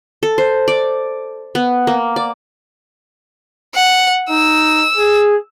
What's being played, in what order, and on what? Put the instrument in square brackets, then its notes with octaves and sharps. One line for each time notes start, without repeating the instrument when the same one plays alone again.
[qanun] A4
C5
D5
B3
A#3
D5
[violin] F#5
[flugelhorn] D#4 [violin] E6
[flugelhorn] G#4